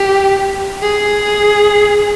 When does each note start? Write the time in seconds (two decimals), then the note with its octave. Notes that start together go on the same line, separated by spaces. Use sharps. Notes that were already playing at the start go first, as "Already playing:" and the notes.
Already playing: G4
0.82 G#4